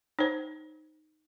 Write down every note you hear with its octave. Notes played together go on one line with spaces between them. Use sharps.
D#4 C5